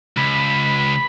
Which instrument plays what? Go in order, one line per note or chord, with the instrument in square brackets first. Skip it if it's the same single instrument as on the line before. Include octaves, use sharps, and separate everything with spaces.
[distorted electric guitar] C#2 [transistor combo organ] B5